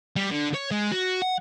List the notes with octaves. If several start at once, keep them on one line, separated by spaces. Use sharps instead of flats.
G3
D3
C#5
G#3
F#4
F#5